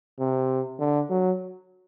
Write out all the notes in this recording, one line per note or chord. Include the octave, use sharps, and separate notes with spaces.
C3
D3
F#3